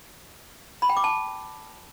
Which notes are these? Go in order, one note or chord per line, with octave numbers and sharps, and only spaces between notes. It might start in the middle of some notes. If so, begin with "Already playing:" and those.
B5
G5
D6
A5